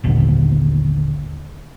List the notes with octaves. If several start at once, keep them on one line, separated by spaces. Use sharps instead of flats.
G#1 D#2 A#2 D3